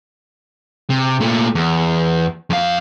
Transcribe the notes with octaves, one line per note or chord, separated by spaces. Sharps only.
C3
A#2 A3
E2
F2 F5